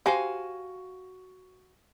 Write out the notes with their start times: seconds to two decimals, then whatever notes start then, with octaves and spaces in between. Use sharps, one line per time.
0.06 F#4 G4 C5 F5 G#5